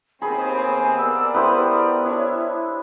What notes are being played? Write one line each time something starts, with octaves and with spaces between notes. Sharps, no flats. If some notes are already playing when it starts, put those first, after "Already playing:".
D#2 B3 C4 G#4 G#5 B5
B3 A#4 D5 E6
E4 G4 B4 C5 D#6
D4 E4 C#5